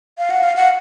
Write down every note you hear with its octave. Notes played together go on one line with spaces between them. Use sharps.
F5
F#5
F5
F#5